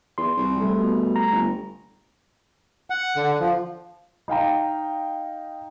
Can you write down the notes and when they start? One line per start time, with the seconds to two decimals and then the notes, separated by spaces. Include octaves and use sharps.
0.18 E2 C6
0.37 C2
0.56 G3 A3
0.78 B2
1.16 A#5
1.32 G1
2.90 F#5
3.16 D3
3.40 F3
4.28 D#4 F5 G5 A#5